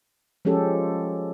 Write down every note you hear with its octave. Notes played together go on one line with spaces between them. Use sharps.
F3 G#3 C#4 G4 A4